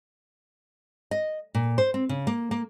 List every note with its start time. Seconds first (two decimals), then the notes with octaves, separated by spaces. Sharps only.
1.11 D#5
1.55 A#2
1.78 C5
1.94 C4
2.09 C#3
2.27 A#3
2.51 A#3